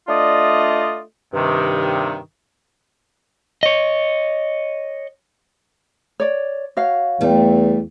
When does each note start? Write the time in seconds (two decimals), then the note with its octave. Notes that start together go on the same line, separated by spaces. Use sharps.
0.08 A3 D4 F4 D5 D#5
1.34 G2 C3 D#3
3.63 C#5 D#5
6.20 C#5 D5
6.77 F#4 C#5 F5
7.21 E2 G3 A3